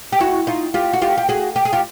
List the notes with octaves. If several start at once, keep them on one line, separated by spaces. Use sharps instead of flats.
G4
E4 F#4
D#4 F4
F4 G4
F#4
F4 G4
G4
F#4 G#4
G4
G#4
F4 G4